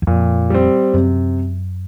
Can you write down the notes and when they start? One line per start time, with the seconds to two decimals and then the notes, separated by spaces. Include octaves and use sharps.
0.02 E2
0.07 F2 A#2
0.50 G3 C4
0.94 F#2 C3